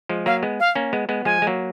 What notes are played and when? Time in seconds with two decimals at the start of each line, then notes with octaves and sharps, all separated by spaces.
0.09 F3 G#3
0.26 F#3 A#3 F5
0.43 G#3 B3
0.60 F5
0.75 A#3 C#4
0.93 G#3 B3
1.09 G#3 B3
1.25 F3 G#3 G#5
1.42 G#3
1.47 F#3 A#3